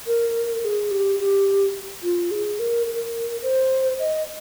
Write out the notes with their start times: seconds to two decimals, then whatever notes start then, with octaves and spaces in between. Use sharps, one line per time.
0.07 A#4
0.64 G#4
0.91 G4
1.19 G4
2.03 F4
2.31 G#4
2.59 A#4
2.87 A#4
3.42 C5
3.99 D#5